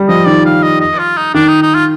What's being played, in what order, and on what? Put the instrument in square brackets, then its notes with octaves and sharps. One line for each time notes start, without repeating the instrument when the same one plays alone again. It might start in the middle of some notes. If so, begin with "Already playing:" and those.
Already playing: [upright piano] G3
[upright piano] F3 [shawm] D#5
[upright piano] D#3 [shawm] D5
[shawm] F5
D#5
D#5
F4
D#4
[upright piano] D#3 [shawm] D4
[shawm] D#4
D#4
F4